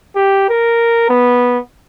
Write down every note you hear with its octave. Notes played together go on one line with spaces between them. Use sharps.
G4
A#4
B3